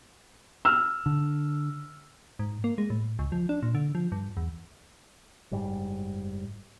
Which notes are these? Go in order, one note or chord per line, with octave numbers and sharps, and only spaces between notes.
E6 F6
D3
G#2
A#3
G#3
A2
C#2
F3
D4
A#2
D3
F3
G2
E2
F#1 G#2 G3